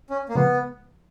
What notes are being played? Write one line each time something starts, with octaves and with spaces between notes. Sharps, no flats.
C#4
A#3
C#3 F3 G#3 B3